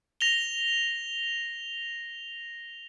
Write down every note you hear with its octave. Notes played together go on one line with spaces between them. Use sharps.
A#6 F7 G7